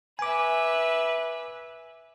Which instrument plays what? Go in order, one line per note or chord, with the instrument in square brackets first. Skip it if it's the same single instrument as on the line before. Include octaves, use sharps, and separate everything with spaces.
[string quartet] B4 E5 [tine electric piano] G#5 D6